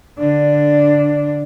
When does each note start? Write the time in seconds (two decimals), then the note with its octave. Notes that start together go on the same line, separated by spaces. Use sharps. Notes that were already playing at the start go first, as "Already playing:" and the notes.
0.19 D3 D4